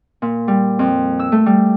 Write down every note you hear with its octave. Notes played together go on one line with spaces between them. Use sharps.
A#2
G3
F2
E6
A3
G3